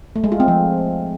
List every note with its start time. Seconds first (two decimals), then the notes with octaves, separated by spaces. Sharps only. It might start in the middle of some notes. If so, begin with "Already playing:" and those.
0.16 A3
0.24 G#3
0.32 F4
0.40 C4
0.48 F3